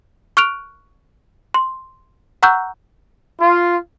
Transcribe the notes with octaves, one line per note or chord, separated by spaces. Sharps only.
C#6 F6 F#6 D7 F7
C6
F#5 A#5 C#6 E6 F#6 G6
F4